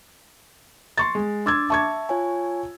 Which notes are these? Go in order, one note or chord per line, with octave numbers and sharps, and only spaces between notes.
C6 C#6 A6
G#3
D4 C6 D6 E6 G#6 A6
E5 A5 C#6 G#6
F4 C#5 G#5